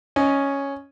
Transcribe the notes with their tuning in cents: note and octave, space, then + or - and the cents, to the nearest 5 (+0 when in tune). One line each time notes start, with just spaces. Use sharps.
C#4 +0 D#5 +0